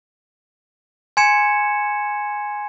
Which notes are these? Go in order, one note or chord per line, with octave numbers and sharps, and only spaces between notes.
G#5 C6 G#6 C#7 E7